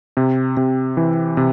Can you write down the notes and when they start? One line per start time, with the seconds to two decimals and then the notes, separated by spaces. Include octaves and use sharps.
0.17 C3
0.57 C3
0.97 E3
1.37 C3